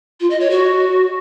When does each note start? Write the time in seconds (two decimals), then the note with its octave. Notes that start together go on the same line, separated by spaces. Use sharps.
0.20 F4
0.30 D#5
0.40 C#5
0.50 F#4